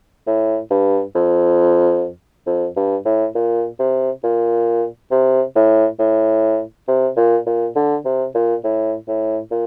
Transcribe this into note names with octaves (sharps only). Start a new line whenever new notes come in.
A2
G2
F2
F2
G2
A2
A#2
C3
A#2
C3
A2
A2
C3
A#2
A#2
D3
C3
A#2
A2
A2
A#2